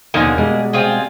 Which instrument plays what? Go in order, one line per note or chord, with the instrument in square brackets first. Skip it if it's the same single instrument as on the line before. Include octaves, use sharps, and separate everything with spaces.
[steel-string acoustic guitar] D#2 B2 [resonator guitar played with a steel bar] D3 F3 D#4 [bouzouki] A#3 G#4
[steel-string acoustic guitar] B2 G#3 [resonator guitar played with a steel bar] G3
[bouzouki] C4 F4 G#4